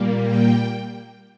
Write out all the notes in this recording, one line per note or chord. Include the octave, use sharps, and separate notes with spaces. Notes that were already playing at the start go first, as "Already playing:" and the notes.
Already playing: A#2 G3 A#3
G5